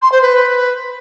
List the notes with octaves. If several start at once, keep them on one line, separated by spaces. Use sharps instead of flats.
C6
C5
B4